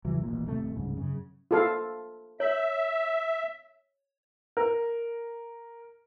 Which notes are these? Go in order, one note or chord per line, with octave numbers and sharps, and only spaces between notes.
E2 C#3 E3 F#3
D#1 A1 A#2
D#1 A2 C3 A3
D1 C2 G#2 C#3
F#2 C#3
F4 A4 F5
C#5 E5
A#4